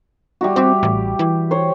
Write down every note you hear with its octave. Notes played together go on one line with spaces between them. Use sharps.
G3 E4 F#4
G3 C4 G4
A1
E3
C5 C#5